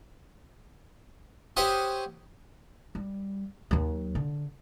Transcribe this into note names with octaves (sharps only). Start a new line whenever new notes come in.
G4 C5 C#5 E5 F#5 D#6
G3
D#2 F#3
D3